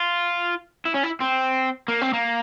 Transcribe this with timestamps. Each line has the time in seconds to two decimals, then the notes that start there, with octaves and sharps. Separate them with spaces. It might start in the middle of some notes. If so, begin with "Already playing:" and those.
Already playing: F4
0.86 E4
0.94 C#4
1.04 E4
1.21 C4
1.88 A#3
2.01 C4
2.13 A#3